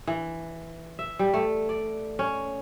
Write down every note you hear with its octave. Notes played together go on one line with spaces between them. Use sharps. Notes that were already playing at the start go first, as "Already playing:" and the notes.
E3
E5
G3
A3
D5
C#4